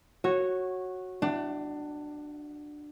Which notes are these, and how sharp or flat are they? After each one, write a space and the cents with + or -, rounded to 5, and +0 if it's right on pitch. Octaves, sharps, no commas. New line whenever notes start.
F#4 +0 C#5 -15
D4 +15 F#5 +45